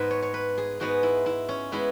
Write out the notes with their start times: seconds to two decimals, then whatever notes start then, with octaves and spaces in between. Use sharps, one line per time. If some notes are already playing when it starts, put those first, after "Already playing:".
Already playing: G#2 G#3 B3 B4
0.11 C#5
0.22 C#5
0.34 B4
0.58 G#4
0.80 G#2 G#3 B3 F#4
1.03 E4
1.26 E4
1.49 C#4
1.72 G#3 B3 E4